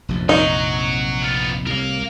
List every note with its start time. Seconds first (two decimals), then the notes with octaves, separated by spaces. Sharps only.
0.09 F1 A#1 F2
0.29 F#3 D#4 F#4
1.22 B3 F4
1.66 C2 A2 A#4 F5